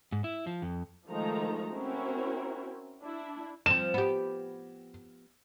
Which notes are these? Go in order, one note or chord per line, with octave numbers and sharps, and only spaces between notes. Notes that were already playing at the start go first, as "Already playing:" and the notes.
G#2
E4
F3
F2
D#3 F3 G#3 A3 D#4 A#5
C4 C#4 E4 F#4 A#4
D4 E4
F3 C4 E7
B3 G4